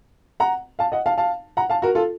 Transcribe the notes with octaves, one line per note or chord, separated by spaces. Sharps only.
F#5 A#5
F5 A5
D#5 F#5
F5 A5
F5 A5
F#5 A#5
F5 A5
F#4 A#4
F4 A4